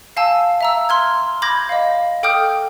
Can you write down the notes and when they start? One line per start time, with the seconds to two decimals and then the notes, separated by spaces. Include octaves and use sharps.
0.17 F5 G#5 A5 E6
0.61 E5 A#5 E6
0.89 C6 F6 G#6
1.42 B5 D6 G6 G#6 A#6
1.69 D#5 F5
2.23 A4 G5 D6 D#6 F6 G6